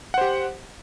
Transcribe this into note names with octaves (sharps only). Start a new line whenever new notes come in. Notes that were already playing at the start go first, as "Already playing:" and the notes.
G4 C5 F#5